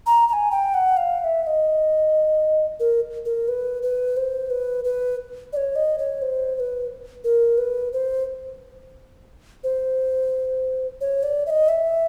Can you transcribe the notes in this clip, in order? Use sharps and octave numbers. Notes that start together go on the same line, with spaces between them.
A#5
A#5
G#5
G5
F#5
F5
F5
E5
E5
D#5
A#4
A#4
B4
B4
C5
B4
B4
D5
C#5
D#5
C#5
C5
C5
B4
A#4
B4
C5
C5
C#5
D5
E5
D#5
E5